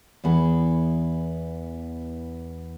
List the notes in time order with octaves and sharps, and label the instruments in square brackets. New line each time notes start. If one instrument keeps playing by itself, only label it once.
[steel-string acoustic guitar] E2 E3 B3 G#4